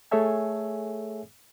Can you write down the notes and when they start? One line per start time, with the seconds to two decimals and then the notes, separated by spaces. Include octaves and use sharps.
0.11 A3 G#4 A4 C#5 E5 G#5